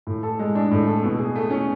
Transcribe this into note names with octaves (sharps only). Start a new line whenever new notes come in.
A2
A4
G#3
D4
A2
A4
B2
G#4
A3
C#4